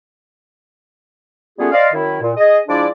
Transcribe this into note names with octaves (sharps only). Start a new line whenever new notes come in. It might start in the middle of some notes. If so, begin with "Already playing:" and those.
G3 A3 B3 C#4 F4 G#4
C5 D5 D#5 F5
F#2 D#3 E4
A#2
G#4 D#5
F3 G#3 D4 E4 D5